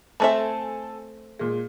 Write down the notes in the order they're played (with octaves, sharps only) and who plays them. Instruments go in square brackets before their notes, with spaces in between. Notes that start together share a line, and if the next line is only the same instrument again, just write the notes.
[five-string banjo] A3 C4 E5 [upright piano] A4 G#5 A5
[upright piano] A#2 G#3